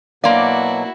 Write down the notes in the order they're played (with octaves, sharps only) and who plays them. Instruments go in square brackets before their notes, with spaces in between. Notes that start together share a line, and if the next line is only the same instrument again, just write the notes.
[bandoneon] B2 F#3 [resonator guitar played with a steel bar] A#3 D5 [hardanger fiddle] E4 F#4 [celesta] F5 C6